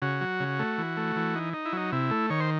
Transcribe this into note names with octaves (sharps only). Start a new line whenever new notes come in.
C#3 F#4
F#3
C#3
A3
E3
A3
E3
D#4
D#4
E4
F#3 D#4
C3 E4
A3
D#3 C#5
C5